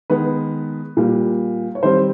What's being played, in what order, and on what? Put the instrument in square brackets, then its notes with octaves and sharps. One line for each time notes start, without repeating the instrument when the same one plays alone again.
[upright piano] D#3 G#3 B3 B4
A#2 G3 A#3
C#5
D#3 G3 C4 C5